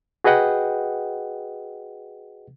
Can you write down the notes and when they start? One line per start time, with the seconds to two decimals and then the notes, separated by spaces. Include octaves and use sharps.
0.24 F#4 G#4 B4 D#5 F#5 G5